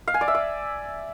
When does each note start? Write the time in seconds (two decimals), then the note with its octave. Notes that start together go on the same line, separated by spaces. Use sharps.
0.08 F5
0.14 G#5
0.21 D5
0.28 E5
0.35 D5